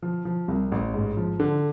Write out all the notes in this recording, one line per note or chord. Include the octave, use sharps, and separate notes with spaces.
F3
F3
C2
A1
G#2
F3
D3